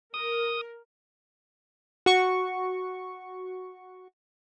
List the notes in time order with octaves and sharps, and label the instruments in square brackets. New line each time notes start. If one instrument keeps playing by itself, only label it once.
[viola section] A#4 [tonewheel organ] D#6
[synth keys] F#4 C#6